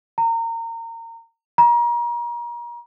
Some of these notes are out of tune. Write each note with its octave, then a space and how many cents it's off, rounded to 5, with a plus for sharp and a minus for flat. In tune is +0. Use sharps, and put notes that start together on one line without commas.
A#5 -25
A#5 +35